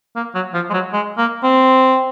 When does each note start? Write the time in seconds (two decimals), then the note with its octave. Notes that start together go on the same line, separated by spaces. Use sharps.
0.16 A#3
0.34 F#3
0.54 F3
0.70 G#3
0.73 F#3
0.93 G#3
1.18 A#3
1.43 C4